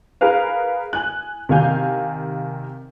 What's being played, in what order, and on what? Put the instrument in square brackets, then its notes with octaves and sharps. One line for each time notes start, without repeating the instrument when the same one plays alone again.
[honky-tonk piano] G#4 A#4 B4 F5
G#5 F#6
C3 D#3 F5 G#5 G6